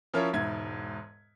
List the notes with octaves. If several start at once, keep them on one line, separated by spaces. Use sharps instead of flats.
F3 C#4 E4 F4 A#4 C#5
E1 G#2 E5 G#6